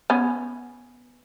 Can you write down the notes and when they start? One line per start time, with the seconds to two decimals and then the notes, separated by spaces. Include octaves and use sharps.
0.10 B3 C#4